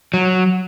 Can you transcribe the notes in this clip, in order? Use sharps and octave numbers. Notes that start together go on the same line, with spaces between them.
F#3